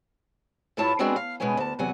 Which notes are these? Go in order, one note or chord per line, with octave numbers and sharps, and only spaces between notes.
G2 E4 F4 C#5 A5
G#3 B3 C4 D4 F#4 G#4
F5
B2 G#3 B3 C#4 G#5
D2 A5
E2 C3 F#3 F#5 G#5